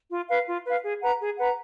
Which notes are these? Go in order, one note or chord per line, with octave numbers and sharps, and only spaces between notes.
F4
B4 F5
F4
B4 F5
G#4
B4 F#5 A#5
G#4
B4 F#5 A#5